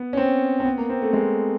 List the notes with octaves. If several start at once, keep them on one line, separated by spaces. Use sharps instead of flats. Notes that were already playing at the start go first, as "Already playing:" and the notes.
Already playing: B3
C#4
C4
C4
B3
A#3
C4
A3
G#3